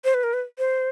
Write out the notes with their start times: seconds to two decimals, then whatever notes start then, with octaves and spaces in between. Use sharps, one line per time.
0.04 C5
0.14 B4
0.24 A#4
0.33 B4
0.58 C5